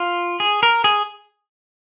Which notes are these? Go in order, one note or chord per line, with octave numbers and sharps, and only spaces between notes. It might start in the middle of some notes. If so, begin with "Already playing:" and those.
Already playing: F4
G#4
A#4
G#4